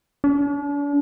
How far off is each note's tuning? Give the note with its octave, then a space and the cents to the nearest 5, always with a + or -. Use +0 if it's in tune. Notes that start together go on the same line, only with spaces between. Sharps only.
D4 -40